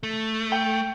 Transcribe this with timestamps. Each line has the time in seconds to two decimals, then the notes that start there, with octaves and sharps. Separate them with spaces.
0.03 A3
0.52 G5